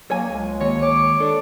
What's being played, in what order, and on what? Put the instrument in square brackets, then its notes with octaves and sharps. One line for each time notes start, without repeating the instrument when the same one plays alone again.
[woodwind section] F#3 A#3 [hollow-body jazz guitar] C#5 G#5
[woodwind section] C#2 G#3
[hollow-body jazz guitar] D#2 [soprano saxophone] C#5
[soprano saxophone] C#5 [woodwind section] D6
[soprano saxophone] D4 [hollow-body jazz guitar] A4